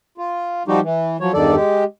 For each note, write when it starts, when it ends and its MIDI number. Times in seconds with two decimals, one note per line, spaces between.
0.18 0.63 65
0.68 0.80 53
0.68 0.80 55
0.68 0.80 63
0.68 0.80 66
0.68 0.80 67
0.83 1.17 52
1.20 1.32 53
1.20 1.32 54
1.20 1.32 73
1.34 1.55 40
1.34 1.55 43
1.34 1.55 51
1.34 1.55 69
1.34 1.55 74
1.55 1.84 56
1.55 1.84 67